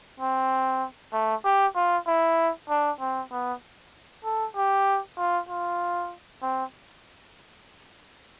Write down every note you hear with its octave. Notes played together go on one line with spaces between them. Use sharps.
C4
A3
G4
F4
E4
D4
C4
B3
A4
G4
F4
F4
C4